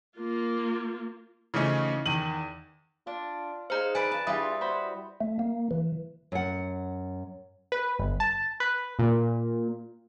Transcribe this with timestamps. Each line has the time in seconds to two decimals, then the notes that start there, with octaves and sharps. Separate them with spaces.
0.18 A#3 F4
1.54 C#3 E3 F3 A3 C#4 D#4
2.06 E2 D#3 D#7 F#7
3.07 D4 F4
3.70 D#4 G#4 C5 F5 A#5
3.95 B4 D5 G#5
4.11 A5
4.27 G3 D4 E4 F4 G#4 D#6
4.61 F#4 C5 B5
5.21 A3
5.39 A#3
5.71 E3
6.32 F#2 F#5
7.72 B4
7.99 G1
8.20 A5
8.60 B4
8.99 A#2